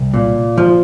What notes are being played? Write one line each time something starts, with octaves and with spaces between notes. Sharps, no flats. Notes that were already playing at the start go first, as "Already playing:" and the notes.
Already playing: C2
A#2
F3